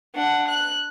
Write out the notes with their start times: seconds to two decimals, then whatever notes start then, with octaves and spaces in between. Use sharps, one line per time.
0.15 D4 F#5
0.48 F#6